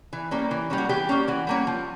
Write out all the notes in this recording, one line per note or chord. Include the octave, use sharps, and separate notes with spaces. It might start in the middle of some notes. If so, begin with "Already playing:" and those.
E3
G3 A#3 C#4
E3
G3 A#3 C#4
F#4
E3 G4
G3 A#3 C#4
E3 F#4
G3 A#3 C#4
F3